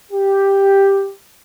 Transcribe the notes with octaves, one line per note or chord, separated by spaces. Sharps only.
G4